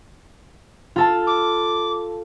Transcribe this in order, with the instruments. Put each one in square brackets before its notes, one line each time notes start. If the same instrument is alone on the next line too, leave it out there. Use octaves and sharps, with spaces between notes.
[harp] F4 A4 A5
[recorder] D6